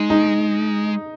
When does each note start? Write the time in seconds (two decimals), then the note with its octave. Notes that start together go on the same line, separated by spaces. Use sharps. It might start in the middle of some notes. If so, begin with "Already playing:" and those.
Already playing: G#3 D#4
0.10 D#4